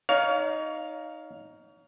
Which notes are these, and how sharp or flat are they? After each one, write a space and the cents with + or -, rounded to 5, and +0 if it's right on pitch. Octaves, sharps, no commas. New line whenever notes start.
D#4 +0 C#5 +35 F5 +5